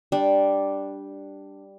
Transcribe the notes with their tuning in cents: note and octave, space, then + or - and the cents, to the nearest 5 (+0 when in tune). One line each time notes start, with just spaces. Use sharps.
G3 +0 D4 +0